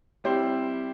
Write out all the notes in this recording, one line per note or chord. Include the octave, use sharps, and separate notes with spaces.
G3 C4 E4 G4 C5